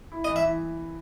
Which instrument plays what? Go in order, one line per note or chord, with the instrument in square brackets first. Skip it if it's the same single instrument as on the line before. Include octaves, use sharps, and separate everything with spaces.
[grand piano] E4
[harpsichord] D#5
[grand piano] E3
[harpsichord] E5
[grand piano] E3